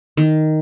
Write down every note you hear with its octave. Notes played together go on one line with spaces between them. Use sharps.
D#3